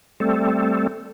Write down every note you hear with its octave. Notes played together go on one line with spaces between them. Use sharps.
G3 A3 C4 A4